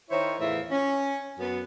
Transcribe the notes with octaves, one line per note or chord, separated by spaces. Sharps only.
D#3 E4 C5 C#5
E2 A2 E3 F4 E5
C#4
F#2 B3